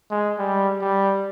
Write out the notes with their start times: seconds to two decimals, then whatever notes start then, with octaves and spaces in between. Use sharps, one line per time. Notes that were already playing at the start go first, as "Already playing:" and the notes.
0.11 G#3
0.39 G3
0.81 G3